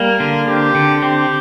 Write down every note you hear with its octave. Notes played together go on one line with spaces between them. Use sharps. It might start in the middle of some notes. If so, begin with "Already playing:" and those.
Already playing: G3 A#3 A#4
D3
C4 G4
D3
C4 G4